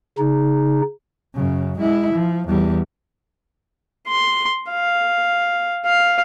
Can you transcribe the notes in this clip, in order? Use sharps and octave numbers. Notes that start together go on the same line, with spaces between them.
C#3 D#4
F#2 C#3
G#3 E4
F3
E2 G3
C6
F5
F5